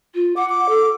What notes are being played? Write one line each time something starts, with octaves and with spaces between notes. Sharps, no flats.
F4
F#5 D6
D6
A4